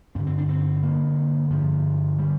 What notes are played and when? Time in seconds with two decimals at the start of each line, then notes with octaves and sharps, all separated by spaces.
0.15 G2 D3 C4
0.27 C4
0.38 D4
0.49 C4
0.83 G2 D3 A#3
1.50 G2 D3 F3
2.19 D3 G3